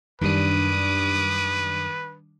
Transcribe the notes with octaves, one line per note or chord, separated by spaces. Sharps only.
F#2 D#3 G3 D4 B4 D6 D#6